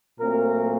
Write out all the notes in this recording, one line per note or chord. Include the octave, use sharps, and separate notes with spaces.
A#2 F#3 A3 C4 A#4